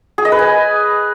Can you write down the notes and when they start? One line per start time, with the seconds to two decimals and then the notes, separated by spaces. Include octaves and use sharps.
0.18 G#4
0.25 D#5
0.32 B4
0.39 G#5